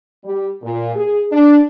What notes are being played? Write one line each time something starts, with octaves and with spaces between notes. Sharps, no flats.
G3
A#2
G#4
D4